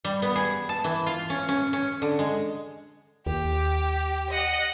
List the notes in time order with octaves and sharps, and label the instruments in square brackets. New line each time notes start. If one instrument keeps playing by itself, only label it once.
[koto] G3
B3
G#4
A5
E3
F4
C#4
C#4
C#4
D3
G#3
[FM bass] D#2 [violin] G4
[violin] D#5 F#5